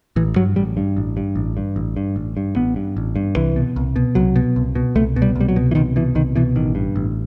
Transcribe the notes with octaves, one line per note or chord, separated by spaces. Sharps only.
A1 E3
G2 F#3
A1 G3
G2
A1
G2
A1
G2
A1
G2
A1
G2
A1 B3
G2
A1
G2
C2 E3
B2
C2
B2
C2 F#3
B2
C2
B2
C2 A3
B2
G3
C2
G3
F#3
B2
E3
C2 D#3
B2 E3
C2 D#3
B2 E3
A1 D#3
G2
A1